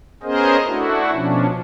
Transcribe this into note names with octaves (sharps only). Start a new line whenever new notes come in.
B3 C#4 G#4 A#4 C5 D#5
A3 D4 E4 F#4
B2 F3 C#4 D4